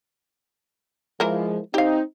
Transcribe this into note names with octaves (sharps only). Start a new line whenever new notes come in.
E3 F3 G#3 A#4
C4 D#4 G4 F5